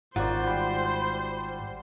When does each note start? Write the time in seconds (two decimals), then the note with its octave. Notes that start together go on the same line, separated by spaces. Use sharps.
0.16 G#1 G#2 F4 F#4 C5 D5 F#5
0.46 G3 G4